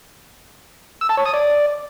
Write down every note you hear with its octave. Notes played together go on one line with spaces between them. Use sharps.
E6
A5
C#5
D#6
D5